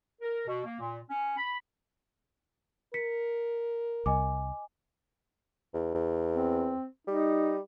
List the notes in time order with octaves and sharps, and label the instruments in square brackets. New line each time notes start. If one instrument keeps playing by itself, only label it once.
[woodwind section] A#4
B2
A#3
A#2
C#4
B5
[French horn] A#4 [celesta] B6 C#7
[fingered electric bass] C2 [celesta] D#5 G#5 D6
[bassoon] E2
E2
[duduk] C4
[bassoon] G3 [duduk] D#4